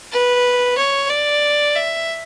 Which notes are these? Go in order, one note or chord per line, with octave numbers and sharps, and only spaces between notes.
B4
C#5
D5
E5